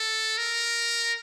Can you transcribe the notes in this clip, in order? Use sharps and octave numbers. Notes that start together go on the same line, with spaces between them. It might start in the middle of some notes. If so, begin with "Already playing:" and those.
Already playing: A4
A#4